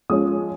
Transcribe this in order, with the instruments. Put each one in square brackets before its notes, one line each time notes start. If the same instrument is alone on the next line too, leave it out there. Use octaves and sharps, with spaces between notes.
[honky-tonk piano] F3 G#3 C#4 D#6